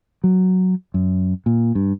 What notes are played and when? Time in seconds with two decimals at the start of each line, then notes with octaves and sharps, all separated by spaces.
0.24 F#3
0.94 F#2
1.46 A#2
1.75 G2